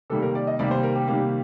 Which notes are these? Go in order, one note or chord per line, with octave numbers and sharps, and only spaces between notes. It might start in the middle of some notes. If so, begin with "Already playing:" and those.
C3 D#3 G3 A#3 A4
A#4
D5
D#5
C3 D#3 G3 A#3 D5
C5
A#4
G4
C3 D#3 G3 A#3